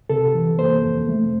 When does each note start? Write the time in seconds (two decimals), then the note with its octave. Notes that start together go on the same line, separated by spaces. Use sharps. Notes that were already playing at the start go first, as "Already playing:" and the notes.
0.10 C3 A4
0.35 E3
0.59 A#3 C5
0.84 F2
1.09 A3